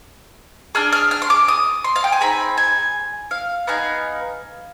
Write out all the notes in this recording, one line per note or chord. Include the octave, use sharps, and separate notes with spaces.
D4 G#4 F6
F6
F6
C6
D6
D#6
C6
F5
G5
G#5
C4 D#4 G#4 B5
G#5
F5
B3 D#4 G#4 F5